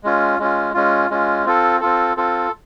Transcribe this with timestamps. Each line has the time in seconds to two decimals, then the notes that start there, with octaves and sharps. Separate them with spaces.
0.04 G#3 C#4 F4
0.39 G#3 C#4 F4
0.74 G#3 C#4 F4
1.10 G#3 C#4 F4
1.45 C4 F4 A4
1.80 C4 F4 A4
2.17 C4 F4 A4